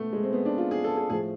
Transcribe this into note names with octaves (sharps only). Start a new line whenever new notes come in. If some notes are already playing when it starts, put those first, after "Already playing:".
Already playing: B2 A3 B3
G#3
C4
B3
D4
F4
G#4
A4
G#4
A2 F3 G#4